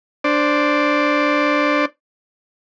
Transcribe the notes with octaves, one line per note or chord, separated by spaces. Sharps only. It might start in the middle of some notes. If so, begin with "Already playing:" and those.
D4 C5 D5